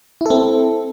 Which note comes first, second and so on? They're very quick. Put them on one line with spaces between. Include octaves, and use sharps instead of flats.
E4 A4 C4